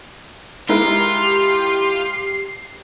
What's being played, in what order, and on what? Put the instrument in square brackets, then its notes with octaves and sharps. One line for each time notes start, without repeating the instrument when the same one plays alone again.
[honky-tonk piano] G#3 E4 A#4 [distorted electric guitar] F4 [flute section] G4 [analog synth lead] C7